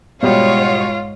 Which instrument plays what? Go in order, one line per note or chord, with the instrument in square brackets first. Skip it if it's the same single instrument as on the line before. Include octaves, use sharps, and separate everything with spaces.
[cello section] G#2 C#5 [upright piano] B2 G3 [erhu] F4